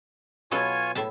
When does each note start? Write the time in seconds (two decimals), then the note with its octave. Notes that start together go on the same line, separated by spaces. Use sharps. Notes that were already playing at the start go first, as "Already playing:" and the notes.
0.51 B2 F#3 F4 A4 C#5 G#5
0.95 A2 E5 A5